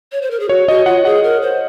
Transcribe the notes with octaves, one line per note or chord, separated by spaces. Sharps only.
C#5
C5
A#4
G#4
F#4 C#5
F#4 D#5
F4 F#5
G#4 F#5
A#4
C5